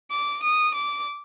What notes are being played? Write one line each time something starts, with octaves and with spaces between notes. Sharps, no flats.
D6
D#6
D6